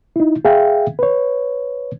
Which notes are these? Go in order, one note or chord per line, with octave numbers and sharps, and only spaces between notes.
D#4 E4
G#4 E5 F5 G5
B4 C#5